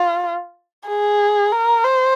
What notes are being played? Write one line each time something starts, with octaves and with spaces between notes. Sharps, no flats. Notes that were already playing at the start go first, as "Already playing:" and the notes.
Already playing: F4
G#4
A#4
C5